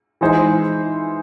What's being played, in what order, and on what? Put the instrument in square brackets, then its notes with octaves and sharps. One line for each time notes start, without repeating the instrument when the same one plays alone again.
[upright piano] E3 G#3 D#4 G#4 C5